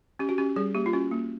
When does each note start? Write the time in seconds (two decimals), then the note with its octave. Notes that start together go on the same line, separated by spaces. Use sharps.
0.19 C#4 G4
0.29 F#4
0.38 C#4 G4
0.56 G3 G#4
0.75 A#3 G4
0.86 F4
0.93 C#4 F#4
1.11 A#3